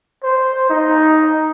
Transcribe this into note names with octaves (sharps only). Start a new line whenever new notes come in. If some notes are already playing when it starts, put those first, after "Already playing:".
C5
D#4